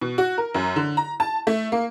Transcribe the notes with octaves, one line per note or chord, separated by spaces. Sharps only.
B2
F#4
A#4
F#2
D3
A#5
A5
A3
A#3